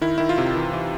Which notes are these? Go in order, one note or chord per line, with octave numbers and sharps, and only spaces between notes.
D#3 E4
D#3 E4
F4
C3
E3
E3